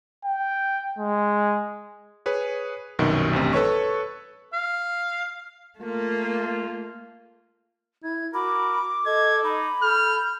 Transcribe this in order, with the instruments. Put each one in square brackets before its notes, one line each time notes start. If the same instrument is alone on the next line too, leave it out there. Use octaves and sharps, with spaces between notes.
[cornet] G5
G#3
[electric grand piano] G#4 B4 C#5
C2 F#2 B2 D#3 F#4
A1 G2 C3
A4 B4 C#5 C#6
[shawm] F5
[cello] A3 A#3 [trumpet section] F4
[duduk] E4 [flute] G#6
[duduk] F#4 [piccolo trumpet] A#4 [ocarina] B5 [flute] D6
[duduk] A4 [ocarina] D#5 [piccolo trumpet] G#6
[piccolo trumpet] D#4 [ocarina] B5
[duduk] A4 [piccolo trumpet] F6 [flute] G6